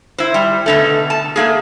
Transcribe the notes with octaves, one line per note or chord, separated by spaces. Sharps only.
E4 C5
G3
B2 D3 A3
A5
A3 A#3 G#4